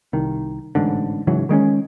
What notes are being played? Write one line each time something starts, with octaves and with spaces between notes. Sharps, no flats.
C2 D#3
A1 G#2 D3
G#2 C#3 E3 F#3
D#3 G#3 C4 C#4